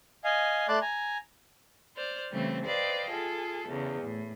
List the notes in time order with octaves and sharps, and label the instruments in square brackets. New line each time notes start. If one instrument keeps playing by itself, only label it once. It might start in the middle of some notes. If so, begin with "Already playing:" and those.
[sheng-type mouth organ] D#5 F5 G#5
A3 D5 A5 C6 D6 F#6
G#5 A#5
[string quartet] C5 D5 F6
C#3 E3 G3 A3 C4
B4 C5 D5 D#5 F5 G5
F4 G#4 A4
E2 C#3
A2